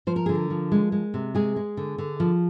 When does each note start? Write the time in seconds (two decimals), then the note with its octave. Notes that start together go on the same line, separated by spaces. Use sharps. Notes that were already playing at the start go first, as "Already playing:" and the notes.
0.07 F3 C5
0.16 A#4
0.26 D3 G#4
0.35 A#4
0.50 F3
0.72 G#3
0.92 G#3
1.14 C3
1.35 G#3 G#4
1.56 G#3
1.77 D3
1.98 D3
2.20 F3